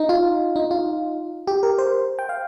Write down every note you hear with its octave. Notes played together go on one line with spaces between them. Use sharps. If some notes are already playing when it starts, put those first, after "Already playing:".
Already playing: D#4
F4
D#4
F4
G4
A#4
C5
G5
F5